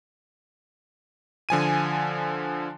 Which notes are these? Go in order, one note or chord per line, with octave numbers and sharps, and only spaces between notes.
D3 F3 G#5 D#7